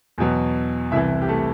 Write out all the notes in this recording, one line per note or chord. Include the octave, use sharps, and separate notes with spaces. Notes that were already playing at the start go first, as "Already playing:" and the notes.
E2 B2 F#3
C2 C3 E3 E4 E5
G4
A3 A4